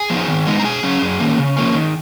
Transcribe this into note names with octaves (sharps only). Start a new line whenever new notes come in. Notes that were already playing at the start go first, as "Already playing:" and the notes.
Already playing: G#4 G#5
F3 B3 D#4
D#3
G#3 B3 D#4
A#5
B2 G#4 G#5
F#3 C#4
F#2
D#3 A#3 C#4
C#3
F3 A#3 C#4
D#3